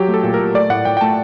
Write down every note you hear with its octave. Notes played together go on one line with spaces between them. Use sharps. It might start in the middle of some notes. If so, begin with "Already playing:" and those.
Already playing: F#3 G4
A3
A4
A#2
A#4
A#2
A3 D5
A2 F#5
A2 G5
G5
A3 A5